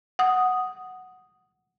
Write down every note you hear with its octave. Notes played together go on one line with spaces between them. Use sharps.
F#5 D#6